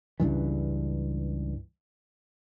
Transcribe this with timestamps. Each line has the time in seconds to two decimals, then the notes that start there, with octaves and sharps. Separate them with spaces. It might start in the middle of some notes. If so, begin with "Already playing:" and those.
0.20 C#2 G2 E3